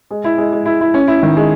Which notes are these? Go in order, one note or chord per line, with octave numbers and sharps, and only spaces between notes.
G#3
E4
G#3
G#3
E4
E4
C#4
E4
D#3
G#3